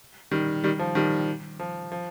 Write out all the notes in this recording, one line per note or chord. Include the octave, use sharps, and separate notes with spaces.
D#3 G3
D#3 G3
F3
D#3 G3
F3
F3